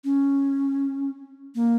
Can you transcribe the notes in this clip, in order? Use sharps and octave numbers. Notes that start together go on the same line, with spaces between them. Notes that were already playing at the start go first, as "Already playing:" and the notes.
C#4
A#3